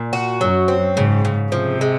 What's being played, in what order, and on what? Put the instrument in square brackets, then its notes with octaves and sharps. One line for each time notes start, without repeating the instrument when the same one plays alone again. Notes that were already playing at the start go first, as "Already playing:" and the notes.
Already playing: [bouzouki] A#2
F#4
[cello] F#2 [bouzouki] F#3
[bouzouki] C4
[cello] G#2 [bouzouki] C#3
[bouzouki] C#3
[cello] C3 [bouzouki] F3
[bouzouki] G#3